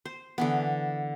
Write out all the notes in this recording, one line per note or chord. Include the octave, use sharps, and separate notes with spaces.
C5
D3 E3 B3